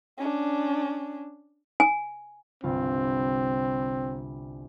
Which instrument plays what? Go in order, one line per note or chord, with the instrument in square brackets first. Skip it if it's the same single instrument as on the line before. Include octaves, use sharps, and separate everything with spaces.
[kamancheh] C#4 D4
[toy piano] G#5
[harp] G1 C2 F4 [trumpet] C4